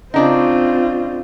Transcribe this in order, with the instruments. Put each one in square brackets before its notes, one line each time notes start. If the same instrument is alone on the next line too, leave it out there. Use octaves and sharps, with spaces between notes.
[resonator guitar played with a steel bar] C#3 D4 D#4 [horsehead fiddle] C4 F4